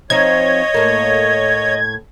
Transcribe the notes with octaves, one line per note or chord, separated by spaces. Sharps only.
F3 C4 D#4 C#5 D#5 G#6
A2 A#3